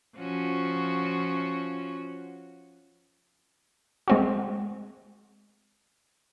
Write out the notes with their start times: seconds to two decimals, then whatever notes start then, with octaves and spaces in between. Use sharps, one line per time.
0.17 F3 C#4 F#4
4.08 G#3 C4 F#4